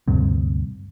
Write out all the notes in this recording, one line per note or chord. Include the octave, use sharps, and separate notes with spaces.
D2 G2 C3